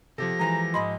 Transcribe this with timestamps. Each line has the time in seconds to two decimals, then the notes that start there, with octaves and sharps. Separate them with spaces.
0.18 C3 F3 G4 A4 A#6
0.39 E3 G#3 A#5
0.74 G#2 D#5 B5 C6